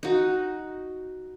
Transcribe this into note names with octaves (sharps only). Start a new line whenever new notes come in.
D#4 F#4